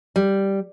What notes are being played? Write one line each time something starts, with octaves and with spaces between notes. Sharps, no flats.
G3